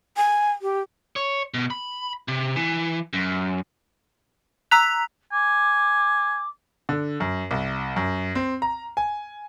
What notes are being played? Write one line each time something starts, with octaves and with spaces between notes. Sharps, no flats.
G#5
G4
C#5
B2
B5
C3
E3
F#2
A#5 E6 F#6 B6 F7
G#5 D6
D3
F#2
C2
F#2
C4
A#5
G#5